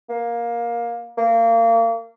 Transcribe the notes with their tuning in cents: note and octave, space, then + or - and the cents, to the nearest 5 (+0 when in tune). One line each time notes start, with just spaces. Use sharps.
A#3 +15
A#3 -30